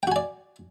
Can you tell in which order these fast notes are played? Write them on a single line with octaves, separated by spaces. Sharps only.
G5 F#4 G#5 D5